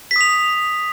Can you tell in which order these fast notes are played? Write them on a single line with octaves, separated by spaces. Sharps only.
B6 D#6 F7